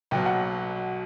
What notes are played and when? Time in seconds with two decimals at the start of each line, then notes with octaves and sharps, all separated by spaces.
0.11 B1 B2 F#3 G5
0.26 F#5